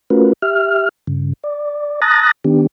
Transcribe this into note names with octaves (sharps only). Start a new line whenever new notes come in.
A3 C#4 F4 F#4 A#4 B4
G4 E5 F6
G2 C#3
D5
A5 A#5 D#6 F#6 A6 A#6
D#3 B3 D4 G4